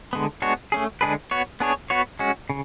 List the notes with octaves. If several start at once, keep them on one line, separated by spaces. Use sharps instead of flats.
D3 G#3 B3
G#3 B3 D4 F#4 C#5
A3 C#4 G#4
D3 G#3 D4 G#4 B4
B3 F#4 C#5
B3 D4 G#4 C#5
B3 F#4 C#5
G#3 C#4 F#4
C#3